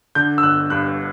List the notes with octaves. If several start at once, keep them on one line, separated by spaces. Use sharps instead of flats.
D3 G6
E6
G1 F#6
G2 F#6